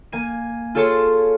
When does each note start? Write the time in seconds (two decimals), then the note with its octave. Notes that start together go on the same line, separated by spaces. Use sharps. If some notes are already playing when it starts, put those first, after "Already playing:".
0.12 A#3 G#5 D#7
0.75 F4 G#4 A4 C#5 A5 C6